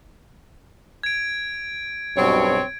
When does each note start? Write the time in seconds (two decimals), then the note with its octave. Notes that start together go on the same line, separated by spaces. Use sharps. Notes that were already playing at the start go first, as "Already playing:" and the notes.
1.03 G#6 D7
2.16 B1 G2 B2 C4 C#5